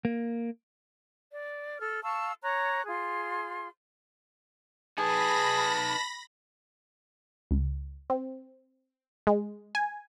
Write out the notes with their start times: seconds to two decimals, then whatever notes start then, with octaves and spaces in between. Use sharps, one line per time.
0.05 A#3
1.32 D5
1.79 A4 F6
2.03 F5 A5 C#6 E6
2.42 C#5 A#5 C#6 F#6
2.87 F4 G#4 C6
4.98 D#4 G#4 B4 A5 B5 A#6
7.51 C#2
8.10 C4
9.27 G#3
9.75 G#5